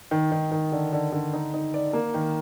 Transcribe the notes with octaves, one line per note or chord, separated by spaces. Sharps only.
D#3
D#3
D#3
D3
D3
D3
D#4
D#4
D5
A#3
D#3